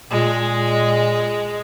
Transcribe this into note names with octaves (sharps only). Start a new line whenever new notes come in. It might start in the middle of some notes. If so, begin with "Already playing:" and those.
A#2 G#3